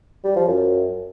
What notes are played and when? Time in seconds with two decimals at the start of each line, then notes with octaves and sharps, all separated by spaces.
0.24 G3
0.36 F3
0.47 F#2